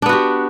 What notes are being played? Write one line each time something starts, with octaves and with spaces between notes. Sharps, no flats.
B3 D4 F#4 G4